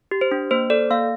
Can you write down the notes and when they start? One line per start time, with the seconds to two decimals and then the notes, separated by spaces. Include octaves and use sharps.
0.11 G4
0.21 C5
0.31 D4
0.51 A#3 C5
0.70 A4 D5
0.90 A#3 F5